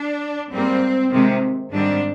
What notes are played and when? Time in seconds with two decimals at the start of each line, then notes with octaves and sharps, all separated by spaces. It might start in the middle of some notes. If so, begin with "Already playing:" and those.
Already playing: D4
0.51 G#2 G3 A#3 C4
1.11 C3 D#3 G#3 C4
1.72 G#2 D#3 G3 C4 D4